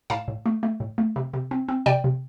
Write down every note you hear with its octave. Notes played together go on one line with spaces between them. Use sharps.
A2 F5 A5
A2
A3
A3
A2
A3
C3
C3
C4
C4
C3 D5 G5
C3